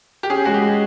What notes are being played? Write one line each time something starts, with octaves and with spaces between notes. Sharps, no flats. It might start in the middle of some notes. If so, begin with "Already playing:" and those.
G4
C#4 G#4
G#3 F#4
G4
G#3